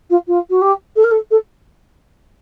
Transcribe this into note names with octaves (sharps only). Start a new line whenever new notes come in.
F4
F4
F#4
G4
A4
A#4
A4
A4